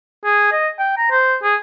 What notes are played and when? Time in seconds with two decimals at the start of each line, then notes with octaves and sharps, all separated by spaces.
0.25 G#4
0.52 D#5
0.79 G5
0.97 A#5
1.11 C5
1.43 G#4